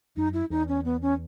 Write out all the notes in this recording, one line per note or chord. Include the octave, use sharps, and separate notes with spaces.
F#2 D#4
E4
E2 D#4
C#4
B3
C#4